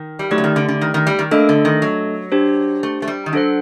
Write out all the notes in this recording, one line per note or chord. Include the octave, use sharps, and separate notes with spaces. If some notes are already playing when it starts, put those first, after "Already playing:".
Already playing: D#3
G3
F#3 A3 D#4 G4 D5
D3
D#3
D3
D3
D#3
D#3
G3
D#3
A3 A#3 D4 A4 D#5
D3
D#3
F#3
D4 G4 C5
A3
A3
G3
D#3
F#3 D4 A4 C5 F#5